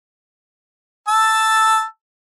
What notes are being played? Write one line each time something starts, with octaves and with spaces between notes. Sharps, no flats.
A5 E6